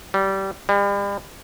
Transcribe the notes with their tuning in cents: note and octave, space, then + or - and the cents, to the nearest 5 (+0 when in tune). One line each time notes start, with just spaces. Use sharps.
G3 -20
G3 +40